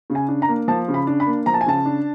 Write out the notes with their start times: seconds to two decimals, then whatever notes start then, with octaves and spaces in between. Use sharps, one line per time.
0.10 C#3
0.15 G#5
0.28 D4
0.42 A#5
0.48 A#3
0.68 F3 A5
0.88 C#3
0.94 B5
1.07 D4
1.20 B5
1.27 A#3
1.46 F3 A#5
1.54 A5
1.61 G#5
1.66 C#3 A5
1.85 D4